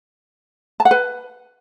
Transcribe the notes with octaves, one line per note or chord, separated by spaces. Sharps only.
A5
F#5
B4